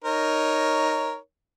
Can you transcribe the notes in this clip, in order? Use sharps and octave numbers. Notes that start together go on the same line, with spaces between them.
D#4 A#4 C#5